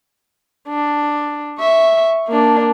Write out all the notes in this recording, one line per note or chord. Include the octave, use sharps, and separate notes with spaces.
D4
E5 C#6
A#3 D4